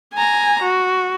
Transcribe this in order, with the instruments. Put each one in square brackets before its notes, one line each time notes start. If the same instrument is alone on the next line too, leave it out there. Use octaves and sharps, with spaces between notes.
[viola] G#5 A#5
F#4